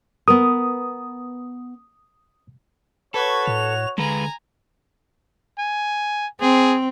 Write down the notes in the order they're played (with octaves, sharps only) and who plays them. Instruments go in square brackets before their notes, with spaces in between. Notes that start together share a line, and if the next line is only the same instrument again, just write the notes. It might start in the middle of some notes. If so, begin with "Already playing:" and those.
[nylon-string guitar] B3 A#4 [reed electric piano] D#6
[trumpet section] F#4 C#5 [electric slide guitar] A4 [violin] B4 G#6
[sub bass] A2 [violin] F7
[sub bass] D3 [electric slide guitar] G#3 B4 [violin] G#5 A#5
[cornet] G#5
[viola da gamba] C4 [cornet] G#4